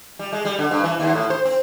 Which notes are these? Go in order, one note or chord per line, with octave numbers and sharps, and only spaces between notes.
G3
G#3
G3
D3
G2
E3
D#2
A2
C5
C4